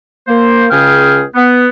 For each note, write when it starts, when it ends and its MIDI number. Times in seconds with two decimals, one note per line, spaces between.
0.28 0.66 58
0.28 0.66 72
0.70 1.23 37
0.70 1.23 49
0.70 1.23 61
0.70 1.23 68
0.70 1.23 79
0.70 1.23 89
1.35 1.68 59